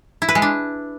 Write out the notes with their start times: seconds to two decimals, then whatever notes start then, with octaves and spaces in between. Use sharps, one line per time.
0.22 E4
0.28 B4
0.35 G#3
0.42 D4